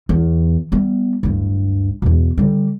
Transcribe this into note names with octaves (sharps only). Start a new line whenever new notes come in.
E2
G3 B3
D1 G2
E2 B2
D3 G3